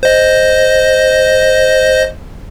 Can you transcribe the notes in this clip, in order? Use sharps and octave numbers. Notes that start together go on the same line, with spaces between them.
C5 D#5